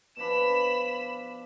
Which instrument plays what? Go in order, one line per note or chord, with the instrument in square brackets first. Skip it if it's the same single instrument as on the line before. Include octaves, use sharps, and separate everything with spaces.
[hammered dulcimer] B2 F3 D4 [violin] B5 E7